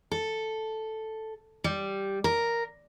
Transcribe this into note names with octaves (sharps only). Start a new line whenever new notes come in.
A4
G3
A#4